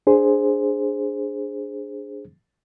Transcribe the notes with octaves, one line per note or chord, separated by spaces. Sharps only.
D4 G#4 C5